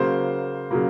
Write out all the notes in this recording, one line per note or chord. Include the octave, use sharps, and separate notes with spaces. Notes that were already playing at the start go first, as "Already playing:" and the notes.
Already playing: C#3 F#3 A#3 C5
C#3 F#3 A#3